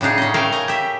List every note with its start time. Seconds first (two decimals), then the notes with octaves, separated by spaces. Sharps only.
0.01 A2 C#3 D4 D#4 G#4
0.18 C#4 D#5
0.34 A3 A#4 F5 G5
0.52 D#5 G#5 A#5
0.68 G4 E5